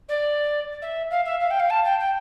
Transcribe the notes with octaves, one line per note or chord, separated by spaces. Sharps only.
D5
E5
F5
E5
F5
G5
F5
A5
G5
G5